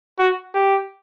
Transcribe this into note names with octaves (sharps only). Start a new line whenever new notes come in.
F#4
G4